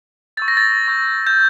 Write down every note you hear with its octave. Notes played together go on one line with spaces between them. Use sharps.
C#6 E6 G6 A6
A#6
A6
C#6 E6 G6
G6